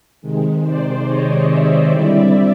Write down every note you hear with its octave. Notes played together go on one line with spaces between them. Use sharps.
C3 D#3 G#3
C5 D5
C#5 D#5
D5 E5
D3 G3 C4 E4